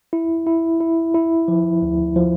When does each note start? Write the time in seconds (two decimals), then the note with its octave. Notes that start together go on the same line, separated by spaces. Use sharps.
0.13 E4
0.46 E4
0.81 E4
1.14 E4
1.48 F3
1.82 D2
2.16 F3